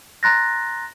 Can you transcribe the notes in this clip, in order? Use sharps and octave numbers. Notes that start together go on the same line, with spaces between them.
A#5 C6 F#6 A6 A#6